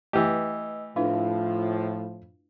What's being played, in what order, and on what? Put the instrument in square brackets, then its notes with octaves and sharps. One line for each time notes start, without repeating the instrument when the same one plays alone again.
[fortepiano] E3 G4 [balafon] A3 B4 [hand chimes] D#5 E6
[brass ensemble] A2 F3 [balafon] D4 E4 B4 [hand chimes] F4 E5 F5